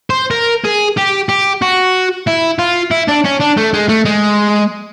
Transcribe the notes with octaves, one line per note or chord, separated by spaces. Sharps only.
C5
A#4
G#4
G4
G4
F#4
E4
F4
E4
D4
C#4
D4
A3
G#3
A3
G#3